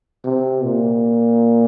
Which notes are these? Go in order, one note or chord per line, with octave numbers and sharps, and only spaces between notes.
C3
A#2